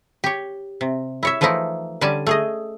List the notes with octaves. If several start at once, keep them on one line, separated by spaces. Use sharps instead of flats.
G4 C#5
C3
E4 C#5 E5
E3 F3 A3 D#4 E4
D3 G3 C#4 D5 G#5 A5
A3 G#4 D#5